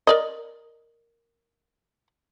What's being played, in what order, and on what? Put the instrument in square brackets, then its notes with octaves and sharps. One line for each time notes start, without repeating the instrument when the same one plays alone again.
[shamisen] A#4 D5 D#5